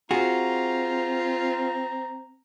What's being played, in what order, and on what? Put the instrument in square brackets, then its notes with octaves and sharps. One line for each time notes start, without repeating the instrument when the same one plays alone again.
[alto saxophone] C4 [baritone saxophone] F4 [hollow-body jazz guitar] F#4 G#4 [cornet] A#5